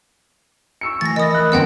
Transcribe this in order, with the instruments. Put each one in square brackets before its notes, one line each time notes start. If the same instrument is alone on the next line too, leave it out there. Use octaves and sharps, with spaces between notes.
[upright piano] C#6 E6 C#7
[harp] E3 [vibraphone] A3 [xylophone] A6 A#6
[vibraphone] A#4 B5 [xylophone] D#5 D#6
[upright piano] F#6
[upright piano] G1 B3 [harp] F2 D3 [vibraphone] C4 [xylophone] D#5 F#5 G5